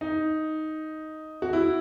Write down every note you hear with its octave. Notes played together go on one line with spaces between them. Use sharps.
D#4
F#4
E4